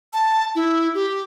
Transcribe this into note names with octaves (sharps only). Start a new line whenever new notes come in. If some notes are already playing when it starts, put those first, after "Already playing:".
A5
E4
G4